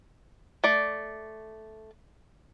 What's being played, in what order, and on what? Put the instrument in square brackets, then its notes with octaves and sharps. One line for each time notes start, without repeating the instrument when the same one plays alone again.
[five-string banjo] A3 D5